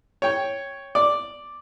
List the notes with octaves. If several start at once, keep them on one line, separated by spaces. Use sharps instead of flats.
C#5 G5
D5